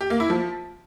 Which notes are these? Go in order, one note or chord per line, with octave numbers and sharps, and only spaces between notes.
G4
A#3
E4
F3